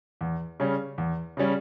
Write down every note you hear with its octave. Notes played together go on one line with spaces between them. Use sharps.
E2
C#3 G3 C#4
E2
C#3 G3 C#4